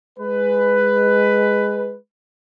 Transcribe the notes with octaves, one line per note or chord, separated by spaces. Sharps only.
G#3 B4